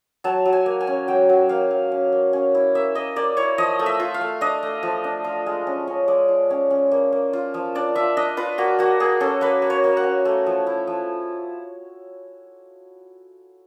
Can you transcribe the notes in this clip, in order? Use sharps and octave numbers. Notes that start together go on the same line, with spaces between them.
F#3 A5
F#3
G#5
A#3
G#5
C#4
F#3 G5
F#3
A#3 F5
F#3
C#4
A#3
C#4
E4
A#3 E5
A#3 D#5
A#3 D5
E4 C#5
F3 D#5
A3
E5
F4
F5
A3
D4 D#5
A3
F3
D4
F4
G#3
C#4
C#4
G#3 D5
F4
C#4
C#4
A#3
A#3
F4
F3
D4 D5
F4 E5
D4 D#5
F4 B4
A#3 F#4
A#3 F#4
A#3 G#4
C#4 A4
A#3 B4
A#3
C#5
A#3
F#5
C#4
A3
F3
E4
F3